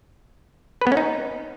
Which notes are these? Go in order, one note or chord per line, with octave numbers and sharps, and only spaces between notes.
B4
B3
C#4
D#4